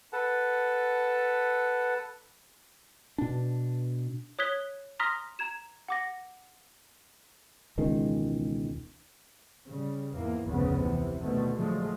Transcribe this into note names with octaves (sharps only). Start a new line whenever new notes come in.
A4 B4 F#5 A5
B2 D4
C#5 D#6 F#6 G#6 B6 G7
A#5 C6 D#6 F6 A#6 B6
A#5 G#6 E7
F#5 D6 A#6
E1 C#2 D#3 G#3
C#3 G3
E2 G#2 E3 A#3
F1 D2 G#2 C#3 B3
C3 E3
B2 D3 D#3 A3
A#2 D3 F3 F#3 G#3 A3